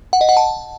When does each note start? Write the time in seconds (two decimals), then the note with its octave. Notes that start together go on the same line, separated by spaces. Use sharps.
0.13 F#5
0.21 D#5
0.29 F#5
0.37 A5